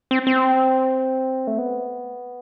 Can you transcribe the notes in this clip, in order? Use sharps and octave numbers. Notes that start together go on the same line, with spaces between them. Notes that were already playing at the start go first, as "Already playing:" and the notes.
C4
C4
A3
B3